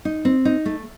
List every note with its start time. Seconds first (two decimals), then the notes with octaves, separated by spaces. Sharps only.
0.05 D#4
0.25 C4
0.45 D#4
0.65 A3